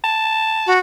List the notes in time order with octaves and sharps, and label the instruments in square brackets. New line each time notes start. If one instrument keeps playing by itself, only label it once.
[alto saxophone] A5
[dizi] F#4